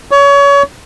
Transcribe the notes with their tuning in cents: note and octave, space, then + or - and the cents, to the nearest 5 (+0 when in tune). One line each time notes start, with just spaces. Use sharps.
C#5 +30